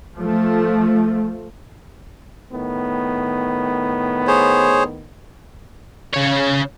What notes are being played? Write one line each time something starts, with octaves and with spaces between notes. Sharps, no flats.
F3 A3
A2 D#3 B3
G#4 C5 C#5
C#3 C#5